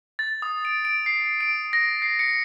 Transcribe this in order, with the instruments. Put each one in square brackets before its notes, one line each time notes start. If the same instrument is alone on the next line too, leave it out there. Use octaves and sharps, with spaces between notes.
[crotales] A6
D#6
D7
D7
C7
D7
A#6
C7
C#7